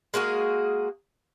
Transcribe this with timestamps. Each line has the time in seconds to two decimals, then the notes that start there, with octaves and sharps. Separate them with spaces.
0.14 G#3 A#3 F#4 G#4